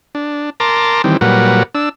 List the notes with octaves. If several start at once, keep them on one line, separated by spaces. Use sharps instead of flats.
D4
A#4 A5 A#5 C6 D6
D#3 E3 G3 C4
A#2 F#3 G3 A#4 B4 F#5
D4 E6